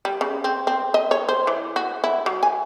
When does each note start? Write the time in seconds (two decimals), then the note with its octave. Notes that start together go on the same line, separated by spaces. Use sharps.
0.05 G3
0.21 C#3
0.44 C4
0.67 C4
0.94 D#5
1.11 C#5
1.29 C5
1.47 E3
1.76 F#4
2.04 E4
2.26 F#3
2.43 G#5